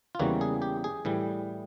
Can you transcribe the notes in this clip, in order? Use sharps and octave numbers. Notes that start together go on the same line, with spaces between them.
F4
E2 C#3 E3 G3 A#3 F#4
G#4
G4
G#4
A2 E3 G3